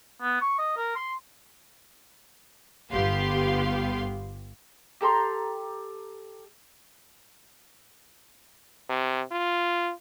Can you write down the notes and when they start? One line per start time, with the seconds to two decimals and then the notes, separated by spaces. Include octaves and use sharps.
0.22 B3
0.41 C#6
0.59 D#5
0.77 A#4
0.96 C6
2.91 G1 B3 G4 F5 C6
5.01 G4 A4 A#5 C6
8.89 C3
9.32 F4